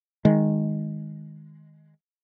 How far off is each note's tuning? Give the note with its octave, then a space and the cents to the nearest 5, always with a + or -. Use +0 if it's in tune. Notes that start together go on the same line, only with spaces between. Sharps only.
D#3 +0 G#3 +0